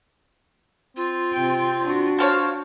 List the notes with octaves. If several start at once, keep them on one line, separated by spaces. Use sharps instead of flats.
C4 F4
C3 G5
D4 F#4
F4 C5 C#5 F5 A5